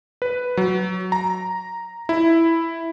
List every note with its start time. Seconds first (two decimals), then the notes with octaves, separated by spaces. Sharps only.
0.22 B4
0.57 F#3
1.12 A#5
2.09 E4